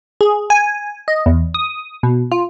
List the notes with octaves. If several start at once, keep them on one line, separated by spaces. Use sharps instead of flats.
G#4
G#5
D#5
E2
D#6
B2
F4